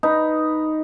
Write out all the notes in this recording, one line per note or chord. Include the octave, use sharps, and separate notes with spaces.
D#4 B4